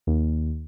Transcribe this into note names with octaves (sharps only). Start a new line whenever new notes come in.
D#2